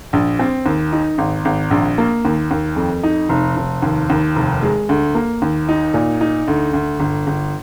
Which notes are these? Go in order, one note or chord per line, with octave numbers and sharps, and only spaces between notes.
A#1
C4
D#2
D#4
G#1
G#1
A#1
A#3
D#2
D#2
F2
D#4
F1
F1
D#2
D#2
F1
G#3
D2
A#3
D#2
D#4
A#2
D#4
D2
D2
G1
G1